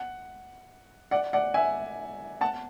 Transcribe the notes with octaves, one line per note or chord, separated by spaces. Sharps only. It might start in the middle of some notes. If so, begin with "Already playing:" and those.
Already playing: F#5
D5 F#5
D5 F#5
E5 G#5
F#5 A5